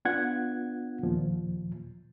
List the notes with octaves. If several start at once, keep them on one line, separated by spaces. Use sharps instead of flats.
B3 D4 F4 F#5 G#6
D#2 A#2 F3